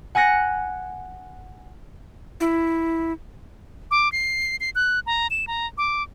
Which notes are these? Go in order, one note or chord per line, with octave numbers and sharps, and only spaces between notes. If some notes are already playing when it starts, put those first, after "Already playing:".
F#5 G#5 F#6 A#6 C#7
E4
D6
C7
C7
F#6
A#5
E7
A#5
D6